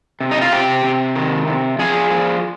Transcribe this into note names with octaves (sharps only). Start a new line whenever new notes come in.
C3
D#4
F4
C3 G4
C3
D#3
C3
F3 G#4
F3